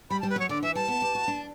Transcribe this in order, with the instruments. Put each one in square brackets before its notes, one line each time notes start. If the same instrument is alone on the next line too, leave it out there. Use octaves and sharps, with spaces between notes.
[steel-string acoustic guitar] G3 [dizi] B5
[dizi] A5
[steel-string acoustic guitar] G3
[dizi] B4
[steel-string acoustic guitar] F#3 [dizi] C#5
[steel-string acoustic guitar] D3 [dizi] D5
[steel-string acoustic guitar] E3 [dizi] E5
[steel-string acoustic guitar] G3 [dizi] A5
[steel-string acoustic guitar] B3
G4
F#4
D4